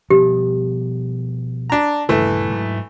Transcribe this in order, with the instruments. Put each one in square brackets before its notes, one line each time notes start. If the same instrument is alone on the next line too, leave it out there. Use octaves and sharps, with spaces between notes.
[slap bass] B2 F3 G3 [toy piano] G4
[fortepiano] D4 A#5
[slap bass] D#1 G2 C#3 [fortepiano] E3 A3
[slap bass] G#2 F#3